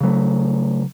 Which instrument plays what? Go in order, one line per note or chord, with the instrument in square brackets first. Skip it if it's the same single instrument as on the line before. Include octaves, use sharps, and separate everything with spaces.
[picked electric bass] C#3 F#3 A3